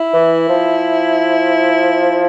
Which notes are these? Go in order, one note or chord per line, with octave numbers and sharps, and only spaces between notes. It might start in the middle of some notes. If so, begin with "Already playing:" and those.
Already playing: E4
E3
F3